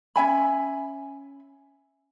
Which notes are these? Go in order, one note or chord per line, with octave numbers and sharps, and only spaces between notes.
C#4 E5 G#5 B5